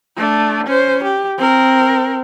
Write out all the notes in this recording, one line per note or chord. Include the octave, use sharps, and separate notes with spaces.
A3 D4
C#4 C5
G4
C4 A#4